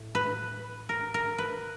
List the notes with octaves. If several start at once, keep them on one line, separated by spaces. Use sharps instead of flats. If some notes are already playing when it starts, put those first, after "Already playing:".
Already playing: A2
B4
A#4
A#4
B4